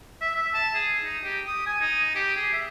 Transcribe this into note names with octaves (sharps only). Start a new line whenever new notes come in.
E5
E5
A5
G#4
D#4
G4
D#6
G#5
D#4
G4
G#4
E5